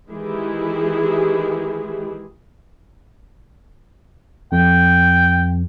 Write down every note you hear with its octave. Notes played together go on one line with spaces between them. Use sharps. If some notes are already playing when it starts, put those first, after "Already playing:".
D#3 E3 G#3 E4 G4 G#4
F2 G5